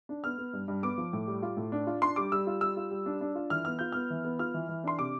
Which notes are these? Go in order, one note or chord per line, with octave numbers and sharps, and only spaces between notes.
D4
B3 F6
B3
G2
G2
B3 D6
F3
A2
G3
F4
A2
D4
F4
D4 C6
G3 D6
G3 E6
F4
G3 E6
F4
G3
D4
D4
F4
E3 F6
B3 F6
F4 G6
B3 F6
E3
B3
F4 F6
E3
E3
D4 C6
C3 D6